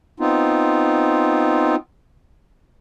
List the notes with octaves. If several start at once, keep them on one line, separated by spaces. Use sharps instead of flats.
B3 C4 D#4 F4